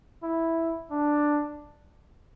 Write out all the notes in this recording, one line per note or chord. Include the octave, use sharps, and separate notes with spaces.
E4
D4